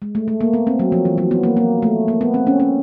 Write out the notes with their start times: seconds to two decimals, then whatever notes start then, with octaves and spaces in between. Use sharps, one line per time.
0.02 G#3
0.15 A3
0.28 A3
0.41 A#3
0.54 B3
0.67 C4
0.79 F#3
0.92 F3
1.05 E3
1.18 F#3
1.31 B3
1.43 A#3
1.57 A#3
1.82 A3
2.08 A#3
2.21 B3
2.34 C4
2.47 C#4
2.60 C#4